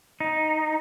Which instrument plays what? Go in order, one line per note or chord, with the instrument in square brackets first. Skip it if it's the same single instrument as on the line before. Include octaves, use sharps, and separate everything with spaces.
[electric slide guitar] D#4